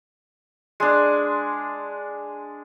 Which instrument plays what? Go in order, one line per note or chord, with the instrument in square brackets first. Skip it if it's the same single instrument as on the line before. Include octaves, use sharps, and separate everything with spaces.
[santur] G#3 D4